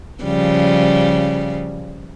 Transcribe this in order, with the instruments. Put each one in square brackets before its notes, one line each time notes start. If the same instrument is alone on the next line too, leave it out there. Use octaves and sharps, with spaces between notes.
[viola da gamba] C#3 F3 G3